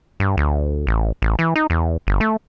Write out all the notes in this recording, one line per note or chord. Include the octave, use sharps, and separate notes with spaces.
G2
D2
A1
A1
E3
D#4
E2
G1
A3